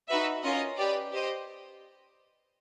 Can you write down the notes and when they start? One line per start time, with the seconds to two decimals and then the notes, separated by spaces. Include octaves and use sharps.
0.08 D#4 F#4 B4 E5
0.43 C#4 F4 A#4 D#5
0.78 G4 B4 D5
1.12 G4 C5 D#5